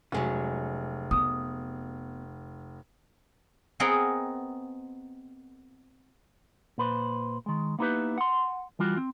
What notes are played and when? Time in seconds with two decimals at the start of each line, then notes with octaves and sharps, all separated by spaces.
0.12 F1 F#3 G#3 C#4
1.11 B3 D#6
3.80 B3 C4 G#4 A#4 D#5 F#5
6.78 A#2 B4 C5
7.46 D#3 G#3
7.79 A#3 B3 D#4 E4 G4 B4
8.18 F#5 C6
8.79 E3 G3 F4 F#4
8.97 C4